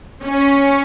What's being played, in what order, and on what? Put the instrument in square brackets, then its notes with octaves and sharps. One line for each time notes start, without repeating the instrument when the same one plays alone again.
[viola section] C#4